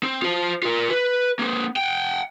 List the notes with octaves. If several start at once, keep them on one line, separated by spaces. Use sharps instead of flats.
C4
F4 C5
F4 A#4
B4
A#3 C4
F#5 G5